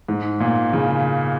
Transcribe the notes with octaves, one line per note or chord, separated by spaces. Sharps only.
G#2
A#2
C#3